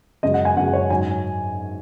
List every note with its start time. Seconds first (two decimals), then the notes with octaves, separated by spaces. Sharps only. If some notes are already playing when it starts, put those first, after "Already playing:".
0.23 F#2 C#3 G#3 D#5
0.34 F#5
0.45 G#5
0.56 F#2 C#3 G#3 F#5
0.73 C#5
0.90 G#2 F#3 G#5